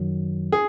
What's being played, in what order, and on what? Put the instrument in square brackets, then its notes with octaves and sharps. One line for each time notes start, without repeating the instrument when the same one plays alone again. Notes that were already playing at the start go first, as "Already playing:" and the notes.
Already playing: [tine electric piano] F#2 D#3 F#3
[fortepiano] G#4